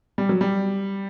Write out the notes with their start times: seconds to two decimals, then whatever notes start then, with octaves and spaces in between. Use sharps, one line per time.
0.18 G3
0.29 F#3
0.41 G3